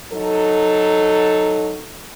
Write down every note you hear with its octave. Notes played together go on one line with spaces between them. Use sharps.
F#3 D#4 A4